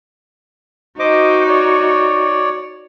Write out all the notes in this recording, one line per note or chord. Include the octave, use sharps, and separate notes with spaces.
D#4 F#4 C5 D#5 D6
C#5 D5